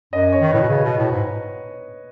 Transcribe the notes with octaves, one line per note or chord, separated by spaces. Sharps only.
F#2 D#5
C#5
D#3
A2 B4
B2
C#3
B2
A2
G#2